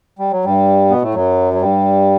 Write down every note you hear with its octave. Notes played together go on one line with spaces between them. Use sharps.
G3
F#3
G2 G3
B2 B3
A2 A3
F#2 F#3
F#3
G2 G3